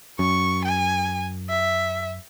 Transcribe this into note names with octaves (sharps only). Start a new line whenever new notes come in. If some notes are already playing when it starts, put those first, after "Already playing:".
F#2 C#6
G#5
E5